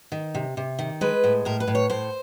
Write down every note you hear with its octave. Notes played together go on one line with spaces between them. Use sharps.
D#3
C3
C3
D#3
G#3 B4
A2
A2 A#4
B4
A2
C#5
A2 C5